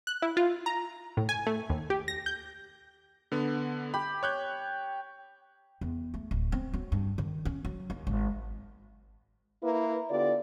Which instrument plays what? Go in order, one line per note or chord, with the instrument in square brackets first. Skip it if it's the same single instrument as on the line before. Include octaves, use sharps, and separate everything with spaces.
[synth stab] F#6
E4
F4
A#5
A2
G#5
A3
D#2
G4
A#6
G6
[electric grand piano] D3 B3
[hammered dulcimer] G4 [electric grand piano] B5
[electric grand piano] C#5 F#6 G6
[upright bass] E2
A3
D1
C4
F#3
G2
D#3
C#4
F#3
D#2
G#1
[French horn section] A#3 E4 B4
D3 B3 F4 G4 D5